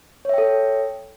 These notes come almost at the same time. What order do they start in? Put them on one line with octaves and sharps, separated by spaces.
C#5 E5 G5 A4